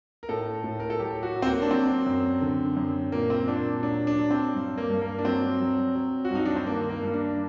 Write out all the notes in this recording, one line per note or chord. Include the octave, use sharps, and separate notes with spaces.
A#4
A2 A4
A2
A#4
A4
F#3 G4
F#4
F#3
C4
A#3
D4
F#3 C4
F#2
D3
F#2
A#2 A#3
C4
A#2 D4
F#3 D4
D4
F#3
C4
G2
A#3
G2
A#3
D4
F#3 C4
F#3
F#3
F#4
G2 D#4
D4
C4
D#3 A#3
A#3
G2
D4